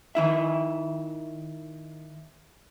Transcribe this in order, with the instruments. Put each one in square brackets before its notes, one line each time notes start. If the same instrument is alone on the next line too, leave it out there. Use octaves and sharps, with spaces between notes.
[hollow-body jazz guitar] D#3 E4 E5